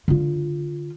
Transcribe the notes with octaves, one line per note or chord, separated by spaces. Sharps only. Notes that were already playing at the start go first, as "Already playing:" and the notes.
D3 F4